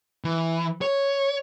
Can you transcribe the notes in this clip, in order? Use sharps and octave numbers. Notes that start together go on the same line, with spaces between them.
E3
C#5